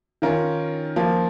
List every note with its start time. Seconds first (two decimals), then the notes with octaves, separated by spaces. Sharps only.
0.22 D#3 C#4 F4 A#4
0.96 F3 A#3 F4